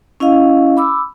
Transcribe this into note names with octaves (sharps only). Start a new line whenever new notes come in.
C#4 E4 D#5 F5
B5 D6 E6